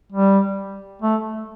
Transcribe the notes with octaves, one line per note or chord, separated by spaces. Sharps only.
G3
A3